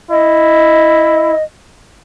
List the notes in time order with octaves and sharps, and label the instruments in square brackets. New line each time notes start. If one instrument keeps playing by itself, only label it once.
[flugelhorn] E4 [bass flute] D#5